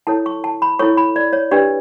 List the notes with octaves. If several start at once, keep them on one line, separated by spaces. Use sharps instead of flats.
E4 A4 C#5 A5
C#6
A5
B5
E4 A4 C#5 C#6
B5
D5
C#5
D4 G4 B4 D5